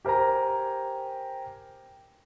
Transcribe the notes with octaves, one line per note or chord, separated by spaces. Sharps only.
G4 A#4 C5 G#5 A#5